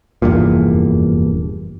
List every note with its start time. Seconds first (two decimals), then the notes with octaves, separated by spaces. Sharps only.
0.22 F1 E2 G2 A#2